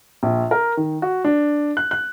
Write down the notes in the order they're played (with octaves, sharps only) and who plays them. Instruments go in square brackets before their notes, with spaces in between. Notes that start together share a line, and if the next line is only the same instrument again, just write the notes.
[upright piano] A#1
A#4
D#3
F#4
D4
F#6
F#6